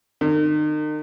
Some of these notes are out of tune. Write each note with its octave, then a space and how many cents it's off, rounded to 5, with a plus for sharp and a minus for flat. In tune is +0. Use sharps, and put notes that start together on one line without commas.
D#3 -40